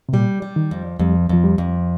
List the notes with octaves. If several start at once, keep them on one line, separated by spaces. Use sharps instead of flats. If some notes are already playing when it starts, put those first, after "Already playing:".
C3
A#2 G3
G3
D#3
F2
F2 G3
F2 F3
G3
F2